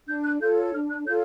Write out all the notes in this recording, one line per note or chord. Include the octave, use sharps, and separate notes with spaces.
D4 G6
F#6
F4 A4 C#5 G6
D4 F6
F#6
F4 A4 C#5 G6